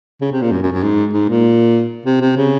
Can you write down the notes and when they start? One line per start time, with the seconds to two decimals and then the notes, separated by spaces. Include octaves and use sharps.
0.21 C#3
0.32 C3
0.42 A#2
0.52 F#2
0.62 F#2
0.73 F#2
0.83 G#2
1.13 G#2
1.29 A#2
2.06 C3
2.21 C3
2.37 C#3